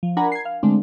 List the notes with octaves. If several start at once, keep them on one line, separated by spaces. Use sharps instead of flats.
F3
D4 A#4 F#5 G#5 A#5 B5
G#6 C7
F5
D3 G#3 A3 C4 D4